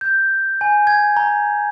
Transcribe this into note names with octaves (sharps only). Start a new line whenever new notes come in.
G6
G#5
G#6
A#5